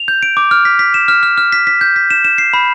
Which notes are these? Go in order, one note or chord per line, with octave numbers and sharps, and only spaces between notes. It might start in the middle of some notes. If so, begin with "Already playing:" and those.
Already playing: F7
G6
D7
D6
F6
B6
B6
E7
F6
F6
F6
B6
B6
G6
B6
E7
E7
C7
B5